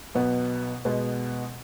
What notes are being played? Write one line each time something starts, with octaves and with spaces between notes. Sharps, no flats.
B1 B2 B3
B2 G#3 B3